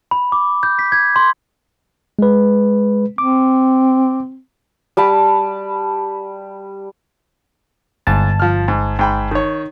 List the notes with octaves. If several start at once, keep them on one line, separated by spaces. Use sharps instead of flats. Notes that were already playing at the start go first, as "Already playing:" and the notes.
B5
D6
G6
B6
G#6
C6
G#3 B4
C4 D6
G3 A5 B5
G1 G#2 A5
F3 F6
G#2
G#2 G5 B5
D#3 C#5